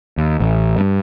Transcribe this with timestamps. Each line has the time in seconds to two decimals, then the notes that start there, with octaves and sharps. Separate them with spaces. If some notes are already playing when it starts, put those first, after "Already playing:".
0.18 D#2
0.40 A1
0.78 G2